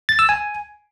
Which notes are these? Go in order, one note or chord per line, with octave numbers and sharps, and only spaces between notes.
A6
E6
G#5